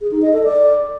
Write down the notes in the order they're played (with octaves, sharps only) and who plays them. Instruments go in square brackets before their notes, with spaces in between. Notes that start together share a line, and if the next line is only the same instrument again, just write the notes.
[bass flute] G#4
D#4
D#5
A4
D5